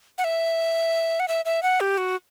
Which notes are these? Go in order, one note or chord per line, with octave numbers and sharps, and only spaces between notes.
F#5
E5
F#5
E5
E5
F#5
G4
F#4